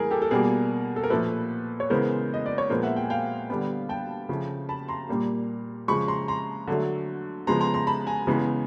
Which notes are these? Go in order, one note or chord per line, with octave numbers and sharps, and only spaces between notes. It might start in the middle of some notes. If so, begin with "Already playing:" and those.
Already playing: A2 E3 G3 A#3 G#4 A#4
G4 A4
A4
B2 G3 A#3 G#4 A#4
A4
A#4
A#2 F3 A3 A4 B4
C#5
C#3 E3 G#3 B3 A#4 C5
D#5
D5
C#5
A#2 F3 G#3 B3 A#4 C5
E5 F#5
G5
G#5
F5 G5
D3 G3 B3
G5 A5
C#3 F3 A3
A5 B5
A#5 C6
A#2 G3 A#3
C#3 F3 G#3 B5 C#6
A#5 C6
A#5 C6
D3 F#3 A3
C#3 F3 G#3 B3 A#5 C6
A#5 C6
A#5 C6
A5 B5
G#5 A#5
C#3 E3 G#3 B3